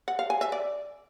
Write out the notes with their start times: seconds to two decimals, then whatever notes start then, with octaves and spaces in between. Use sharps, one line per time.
0.08 F#5
0.19 F5
0.30 G#5
0.41 E5
0.52 D5